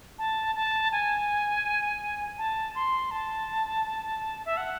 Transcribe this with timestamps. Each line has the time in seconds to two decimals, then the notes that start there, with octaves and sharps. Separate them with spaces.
0.19 A5
0.55 A5
0.92 G#5
2.38 A5
2.75 C6
3.11 A5
4.46 E5
4.57 F#5